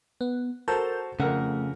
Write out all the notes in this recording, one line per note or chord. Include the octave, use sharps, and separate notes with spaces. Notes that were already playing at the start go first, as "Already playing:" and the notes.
B3
F#4 A4 A#4 C5 A5 G6
F2 C#3 A3 A#4 F#5